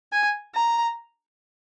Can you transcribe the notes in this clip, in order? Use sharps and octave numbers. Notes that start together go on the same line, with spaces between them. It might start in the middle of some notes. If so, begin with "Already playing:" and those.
G#5
A#5